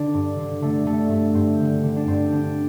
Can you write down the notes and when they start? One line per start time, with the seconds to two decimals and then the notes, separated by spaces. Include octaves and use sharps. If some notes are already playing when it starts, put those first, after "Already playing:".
Already playing: D3 D4
0.14 G2
0.38 D3
0.62 D3 A3
0.86 G2 A3
1.10 G2 A3
1.35 G2 C4
1.60 D3
1.83 D3
1.96 D4
2.07 G2 C4
2.32 D3 D4